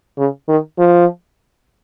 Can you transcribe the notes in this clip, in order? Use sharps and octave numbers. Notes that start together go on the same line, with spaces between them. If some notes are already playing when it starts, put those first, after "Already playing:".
C#3
D#3
F3